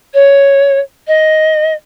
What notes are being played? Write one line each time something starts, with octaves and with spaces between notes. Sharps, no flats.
C#5
D#5